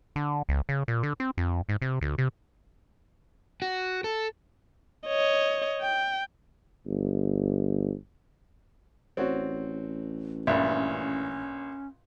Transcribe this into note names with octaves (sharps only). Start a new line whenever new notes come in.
D3
C#2
C#3
A#2
D3
C4
F2
G#2
C3
D2
C3
F#4
A4
C#5 D#5
G5
G1
A1 C4 F#4 C#5 D5
A#1 G2 C#4 D5 E5